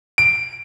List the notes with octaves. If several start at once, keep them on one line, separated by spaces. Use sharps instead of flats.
D7